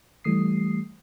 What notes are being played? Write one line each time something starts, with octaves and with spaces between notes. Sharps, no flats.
E3 G3 A3 D#6 C7